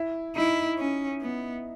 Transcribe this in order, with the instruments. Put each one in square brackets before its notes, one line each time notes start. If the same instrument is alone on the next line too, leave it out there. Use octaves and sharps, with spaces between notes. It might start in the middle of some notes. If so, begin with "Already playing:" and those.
Already playing: [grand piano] E4
[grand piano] D#4 [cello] E4
[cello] C#4
B3